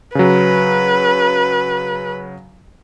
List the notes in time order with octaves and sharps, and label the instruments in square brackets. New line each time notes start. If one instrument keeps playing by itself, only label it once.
[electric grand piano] C#3 F#3 [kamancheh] B4